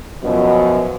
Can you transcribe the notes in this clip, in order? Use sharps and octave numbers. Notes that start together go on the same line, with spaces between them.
F#2 B2 F3